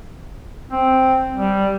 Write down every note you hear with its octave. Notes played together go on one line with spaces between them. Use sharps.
C4
G3